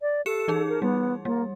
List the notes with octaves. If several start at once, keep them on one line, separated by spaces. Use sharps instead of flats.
D5
G4 A4 C#7 E7
E3 D#4 G#4
A#4
G3 B3
G3 A#3